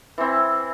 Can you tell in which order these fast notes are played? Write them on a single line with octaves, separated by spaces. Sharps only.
E3 C4 E4